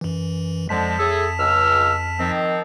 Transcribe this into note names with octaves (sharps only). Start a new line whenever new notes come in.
F#2 E3
F2 D3 F3 G#3 A5 B6
A2 G#4 A4
C#2 E6 F6
D#3 F3 C4